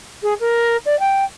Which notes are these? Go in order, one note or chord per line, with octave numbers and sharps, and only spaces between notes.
G#4
A#4
D5
G5